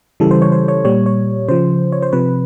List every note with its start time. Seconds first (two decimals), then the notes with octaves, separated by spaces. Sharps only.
0.20 C#3 E3 G3 A4
0.31 C5
0.42 C#5
0.52 C5
0.68 C#5
0.85 A#2 G3 C#5
1.06 C#5
1.49 C#3 F3 C5
1.92 C#5
2.02 C5
2.13 C3 F3 B4